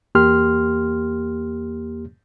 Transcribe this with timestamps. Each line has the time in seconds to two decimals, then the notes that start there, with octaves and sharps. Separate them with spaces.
0.15 E2 A#3 G4 C6 F6